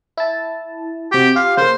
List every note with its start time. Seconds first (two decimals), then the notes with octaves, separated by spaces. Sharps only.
0.17 E4 A5
1.12 C3 F#4 G4
1.36 F4 G4 F5
1.57 C#3 A#3 C5